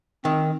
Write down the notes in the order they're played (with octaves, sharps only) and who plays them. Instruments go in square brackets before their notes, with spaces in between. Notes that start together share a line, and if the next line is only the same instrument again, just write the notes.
[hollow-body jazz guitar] D#3 [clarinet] C4